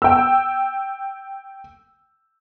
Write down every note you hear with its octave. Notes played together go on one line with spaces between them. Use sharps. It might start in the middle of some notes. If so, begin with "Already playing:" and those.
G5 E6